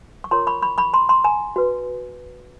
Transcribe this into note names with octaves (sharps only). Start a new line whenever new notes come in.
C#6
F4 A#4 C#5 A#5 C6
B5 C#6
B5 C#6
B5 C#6
A#5 C6
A#5 C6
G#5 A#5
F#4 B4